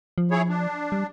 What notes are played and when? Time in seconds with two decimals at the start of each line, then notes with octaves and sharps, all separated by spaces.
0.18 F3
0.31 E4 G#4 C#5
0.49 D4
0.92 G3